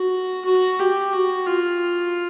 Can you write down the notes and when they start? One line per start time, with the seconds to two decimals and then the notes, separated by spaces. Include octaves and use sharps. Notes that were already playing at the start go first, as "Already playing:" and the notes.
Already playing: F#4
0.45 F#4
0.79 G4
1.13 F#4
1.47 F4